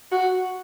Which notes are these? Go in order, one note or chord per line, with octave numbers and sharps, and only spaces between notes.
F#4